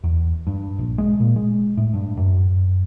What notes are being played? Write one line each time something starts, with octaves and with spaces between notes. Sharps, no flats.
E2
G2
A#1
G#3
A#2
G#3
A2
G2
F#2